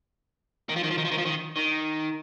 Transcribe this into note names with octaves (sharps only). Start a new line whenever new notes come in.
D#3
F3
D#3
F3
D#3
F3
D#3
F3
D#3
D#3